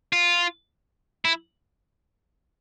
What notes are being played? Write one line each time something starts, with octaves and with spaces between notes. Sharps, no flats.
F4
E4